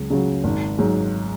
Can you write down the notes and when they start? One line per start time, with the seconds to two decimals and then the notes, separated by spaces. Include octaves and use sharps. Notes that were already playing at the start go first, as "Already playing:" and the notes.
Already playing: C#2 C#3 F#3
0.10 C#3 F#3 C#4 F#4
0.44 G#1
0.79 G#2 F#3